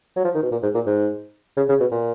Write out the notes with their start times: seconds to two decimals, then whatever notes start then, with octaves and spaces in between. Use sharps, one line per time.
0.16 F#3
0.24 F3
0.34 D#3
0.43 B2
0.52 A#2
0.62 G#2
0.75 A#2
0.86 G#2
1.57 C#3
1.69 C#3
1.80 B2
1.92 A#2